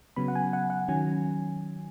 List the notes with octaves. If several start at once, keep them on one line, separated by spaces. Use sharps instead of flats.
C#3 F#3 B3 B5
F#5
G#5
F#5
F#5
D#3 F#3 C#4 G#5